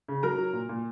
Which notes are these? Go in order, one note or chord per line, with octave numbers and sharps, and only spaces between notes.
C#3
F#3 A#4 A#5
F#3
A#2
A#2